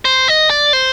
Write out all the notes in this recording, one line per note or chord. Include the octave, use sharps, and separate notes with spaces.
C5
D#5
D5
C5